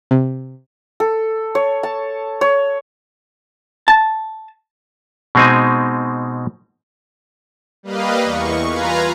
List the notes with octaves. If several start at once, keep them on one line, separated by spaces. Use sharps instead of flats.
C3
A4
C#5
A5
C#5
A5
B2 G#3 C4 D#4 G#5
G3 A#3 B4 D#5 F5
E2 C#6
F4 B4 F5 G#5 A#5